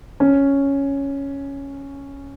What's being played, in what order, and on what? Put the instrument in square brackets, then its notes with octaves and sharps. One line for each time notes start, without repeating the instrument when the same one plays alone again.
[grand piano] C#4